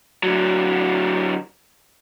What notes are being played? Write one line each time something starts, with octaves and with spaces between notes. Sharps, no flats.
D3 F#3